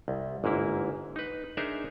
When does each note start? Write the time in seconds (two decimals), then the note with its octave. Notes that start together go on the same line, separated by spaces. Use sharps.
0.08 C2
0.44 G1 G#2 A#3 E4
1.16 D#4 B4
1.57 D4 D#4 G#4 A#4 C5 E5